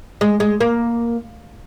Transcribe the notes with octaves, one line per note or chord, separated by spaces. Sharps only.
G#3
G#3
A#3